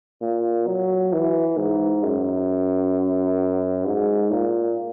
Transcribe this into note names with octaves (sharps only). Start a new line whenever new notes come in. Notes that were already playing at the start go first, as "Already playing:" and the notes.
A#2
F#3
E3
G#2
F#2
G#2
A#2